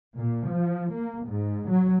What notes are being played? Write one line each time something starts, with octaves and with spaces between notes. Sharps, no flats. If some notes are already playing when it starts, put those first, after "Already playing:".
A#2
F3
A#3
G#2
F#3